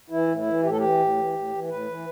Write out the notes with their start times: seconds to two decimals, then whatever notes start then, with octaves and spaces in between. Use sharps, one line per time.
0.10 E3 E4
0.27 A2
0.37 E4
0.46 E3
0.63 A2 G4
0.70 A4
0.77 E3 G4
0.99 A2
1.17 E3
1.33 A2
1.52 E3
1.69 A2 B4
1.87 E3